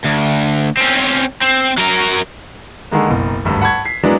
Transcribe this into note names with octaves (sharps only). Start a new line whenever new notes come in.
D2
C4 C#4
C4
F#3 A#4
D3 D#3 G#3 A#3
F#1 B1
G#1 D2 G2
F#5 A5 B5 C#6 G#6
B6 C7
F#3 G#3 A#3 B3 D4 E4